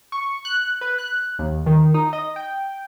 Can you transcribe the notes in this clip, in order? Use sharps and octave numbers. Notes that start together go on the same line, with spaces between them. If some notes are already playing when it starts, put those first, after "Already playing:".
C#6
F#6
B4
F#6
D#2
D#3
D#4
D#5
G5